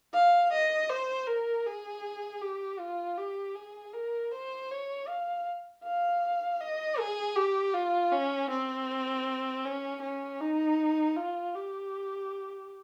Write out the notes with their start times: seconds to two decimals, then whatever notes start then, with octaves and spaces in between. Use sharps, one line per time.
0.13 F5
0.52 D#5
0.89 C5
1.27 A#4
1.67 G#4
2.41 G4
2.80 F4
3.18 G4
3.55 G#4
3.94 A#4
4.32 C5
4.71 C#5
5.08 F5
5.84 F5
6.60 D#5
6.99 G#4
7.36 G4
7.74 F4
8.12 C#4
8.50 C4
9.65 C#4
10.02 C#4
10.41 D#4
11.16 F4
11.54 G4